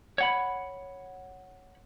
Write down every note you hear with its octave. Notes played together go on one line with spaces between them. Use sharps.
C#5 F#5 B5